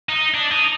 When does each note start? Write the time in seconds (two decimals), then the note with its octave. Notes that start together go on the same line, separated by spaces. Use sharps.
0.09 D#4
0.34 D4
0.51 D#4